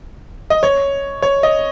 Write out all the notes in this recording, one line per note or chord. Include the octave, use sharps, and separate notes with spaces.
D#5
C#5
C#5
D#5